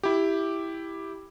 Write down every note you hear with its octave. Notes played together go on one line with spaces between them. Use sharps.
E4 G4